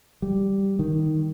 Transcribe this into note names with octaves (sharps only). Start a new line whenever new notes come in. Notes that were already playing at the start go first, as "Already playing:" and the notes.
G3
D#3